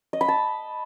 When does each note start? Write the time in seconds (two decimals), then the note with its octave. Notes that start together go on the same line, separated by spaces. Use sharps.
0.13 D#5
0.21 B5
0.28 A5